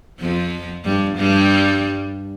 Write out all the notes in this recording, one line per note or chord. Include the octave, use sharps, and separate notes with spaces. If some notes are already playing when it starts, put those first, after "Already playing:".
F2 F3
G2 G3
G2 G3